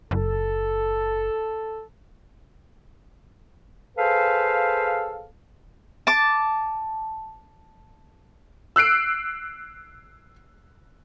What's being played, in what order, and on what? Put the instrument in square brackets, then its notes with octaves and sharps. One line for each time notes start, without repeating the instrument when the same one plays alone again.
[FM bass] F#1 [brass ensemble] A4
[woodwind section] G#4 A4 B4 C5 F5
[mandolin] A5 D6
[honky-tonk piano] E6 F#6 C7 D7